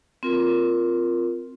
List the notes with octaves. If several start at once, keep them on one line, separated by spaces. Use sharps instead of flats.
C4 F4 A#4